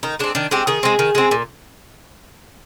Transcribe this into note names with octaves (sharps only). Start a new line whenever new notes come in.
D#3 D#4
G#3 C4 D4
D#3 D4
G#3 C4 G4
D#3 G#4
G#3 C4
D#3
G#3 C4
A#2